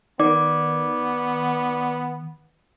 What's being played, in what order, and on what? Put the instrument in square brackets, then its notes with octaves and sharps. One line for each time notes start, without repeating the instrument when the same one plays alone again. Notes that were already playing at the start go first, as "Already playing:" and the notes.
[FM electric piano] D#3 [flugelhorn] B3 [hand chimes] D5 D6